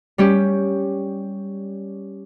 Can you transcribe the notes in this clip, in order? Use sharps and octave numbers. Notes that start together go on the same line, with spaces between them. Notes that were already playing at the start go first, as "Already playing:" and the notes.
G3 C#4 G4